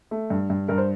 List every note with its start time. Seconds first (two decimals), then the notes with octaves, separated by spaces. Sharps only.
0.11 A3
0.30 G2
0.50 G2
0.68 G2 A#4
0.78 C5